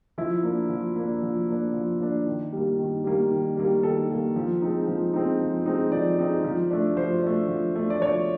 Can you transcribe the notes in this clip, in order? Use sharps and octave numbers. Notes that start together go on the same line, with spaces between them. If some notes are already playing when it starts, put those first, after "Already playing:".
F3 E4
A#3 D4
F3
A#3 D4
F3
A#3 D4
F3
A#3 D4
D#3
G3 A#3
D#3
G3 A#3
D#3
G3 A#3
D#3 A4
G3 A#3
F3
G#3 C4 D#4
F3
G#3 C4 D#4
F3
G#3 C4 D#4
F3 D5
G#3 C4 D#4
F3
A3 D4
F3 C5
A3 D4
F3
A3 D4
D5
F3 C#5